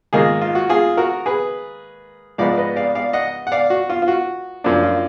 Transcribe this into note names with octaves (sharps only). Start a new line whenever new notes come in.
G#2 D#3 A#3 D#4 F4 G#4
F4
F#4
F4 G#4
F#4 A#4
G#4 B4
G#2 F3 B3 D#4 D5 F5
D5
B4 D#5
D5 F5
D5 F5
D#5 F#5
F#5
D5 F5
F#4
F4
F4
F#4
F#2 F3 A#3 D4
F4